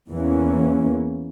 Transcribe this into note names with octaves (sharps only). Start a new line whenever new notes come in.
E2 E3 A#3 C#4